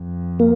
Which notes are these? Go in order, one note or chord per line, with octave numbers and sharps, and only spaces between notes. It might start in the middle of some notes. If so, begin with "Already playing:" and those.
Already playing: F2
A#3